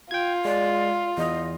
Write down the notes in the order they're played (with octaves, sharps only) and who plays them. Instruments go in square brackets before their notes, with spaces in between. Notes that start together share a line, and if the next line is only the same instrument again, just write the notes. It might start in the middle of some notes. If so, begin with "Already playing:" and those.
[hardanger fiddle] F4 [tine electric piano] G5 G#6
[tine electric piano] G#3 [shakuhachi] D5
[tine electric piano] E2 [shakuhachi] D#5